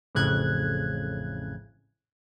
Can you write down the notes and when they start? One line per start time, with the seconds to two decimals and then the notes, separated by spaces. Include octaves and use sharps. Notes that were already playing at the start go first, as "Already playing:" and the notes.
0.15 A1 F2 A2 C#3 F#6 G#6